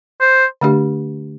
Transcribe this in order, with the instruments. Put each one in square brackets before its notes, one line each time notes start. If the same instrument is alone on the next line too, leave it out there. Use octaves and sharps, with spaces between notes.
[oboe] C5
[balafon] D3 A3 D4 G4